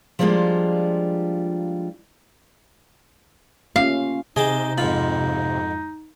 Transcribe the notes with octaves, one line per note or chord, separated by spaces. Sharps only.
F3 G3 G#3 A#3 D4 F4
A#3 C#4 F4 F5
C3 D#4 G#4 D#5 G5 A5
F2 G#2 F4 B5